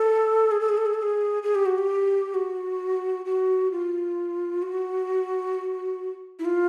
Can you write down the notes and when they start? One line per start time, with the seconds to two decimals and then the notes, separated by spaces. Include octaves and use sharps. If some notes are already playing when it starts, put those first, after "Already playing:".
Already playing: A4
0.51 G#4
0.61 A4
0.69 G#4
0.77 A4
0.86 G#4
0.94 A4
1.02 G#4
1.43 G#4
1.55 G4
1.66 F#4
1.78 G4
2.34 F#4
3.25 F#4
3.72 F4
4.62 F#4
6.39 E4
6.45 F4